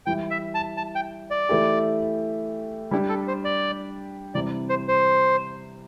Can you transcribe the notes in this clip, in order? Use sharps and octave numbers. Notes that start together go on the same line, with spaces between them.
E3 G3 E4 G5
E5
A5
A5
G5
D5
E3 A3 E4 G4
G3 D4 E4 G4
A4
C5
D5
C3 E3 G3 D5
C5
C5